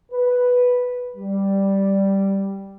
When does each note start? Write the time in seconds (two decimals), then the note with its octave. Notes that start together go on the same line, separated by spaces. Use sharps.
0.12 B4
1.16 G3